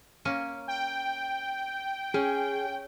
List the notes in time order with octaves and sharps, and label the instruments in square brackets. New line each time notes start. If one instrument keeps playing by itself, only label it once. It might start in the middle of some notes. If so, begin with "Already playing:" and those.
[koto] A#3 C#4
[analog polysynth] G5
[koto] C#4 [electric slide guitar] G#4